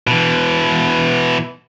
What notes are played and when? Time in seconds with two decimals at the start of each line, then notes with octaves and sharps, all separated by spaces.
0.07 B2 E3